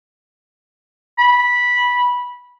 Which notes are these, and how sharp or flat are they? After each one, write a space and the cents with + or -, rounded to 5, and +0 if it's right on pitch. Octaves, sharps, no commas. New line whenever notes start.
B5 -10